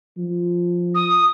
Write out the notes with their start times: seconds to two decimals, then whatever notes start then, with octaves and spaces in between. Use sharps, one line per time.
0.17 F3
0.95 D#6